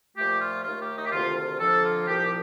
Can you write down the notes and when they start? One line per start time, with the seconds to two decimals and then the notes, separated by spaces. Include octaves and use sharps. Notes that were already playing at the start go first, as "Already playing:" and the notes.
0.17 A#2 F3 A3 G4
0.40 F4
0.64 D#2 D#3 A3 F4
0.80 G4
0.96 D#4
1.06 G4
1.12 D2 C3 D#3 F4
1.36 F4
1.60 F2 D3 F3 A#3 A4
1.83 F4
2.07 C2 A#2 F3 G4